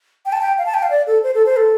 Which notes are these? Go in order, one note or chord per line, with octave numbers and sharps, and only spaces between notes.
G5
A5
G5
F5
A5
G5
F5
D5
A4
C5
A4
C5
A4